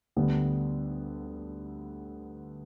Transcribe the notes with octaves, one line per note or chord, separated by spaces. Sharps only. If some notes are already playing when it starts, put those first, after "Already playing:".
D2 D3 G3 B3